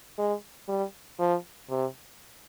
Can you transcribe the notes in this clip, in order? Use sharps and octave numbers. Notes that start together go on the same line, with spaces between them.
G#3
G3
F3
C3